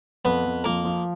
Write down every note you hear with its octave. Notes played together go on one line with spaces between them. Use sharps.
F2 B3 B4
F2
F3 A#3 A#4
F3